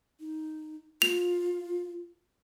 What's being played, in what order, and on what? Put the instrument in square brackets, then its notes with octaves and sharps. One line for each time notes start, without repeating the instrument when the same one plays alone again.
[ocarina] D#4
[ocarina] F4 [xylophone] F7